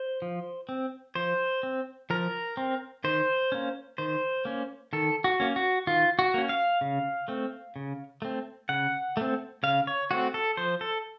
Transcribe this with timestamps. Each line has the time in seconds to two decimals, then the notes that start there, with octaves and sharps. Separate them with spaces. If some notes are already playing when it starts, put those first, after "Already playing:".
Already playing: C5
0.22 F3
0.69 C4
1.15 F3 C5
1.63 C4
2.10 F3 A#4
2.57 C4
3.04 D#3 C5
3.52 A#3 C#4
3.98 D#3 C5
4.45 A#3 C#4
4.93 D#3 A4
5.24 F#4
5.40 A#3 C#4
5.56 F#4
5.87 D#3 F4
6.19 F#4
6.34 A#3 C#4
6.49 F5
6.81 C#3
7.28 A3 C4
7.76 C#3
8.22 A3 C4
8.69 C#3 F#5
9.17 A3 C4
9.63 C#3 F5
9.87 C#5
10.11 A3 C4 F#4
10.34 A4
10.57 F3 C5
10.81 A4